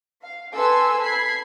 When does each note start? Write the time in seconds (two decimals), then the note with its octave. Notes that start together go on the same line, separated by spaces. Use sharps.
0.22 F5
0.54 A4 B4 G#5 C6 E6
1.02 B5 G#6 C7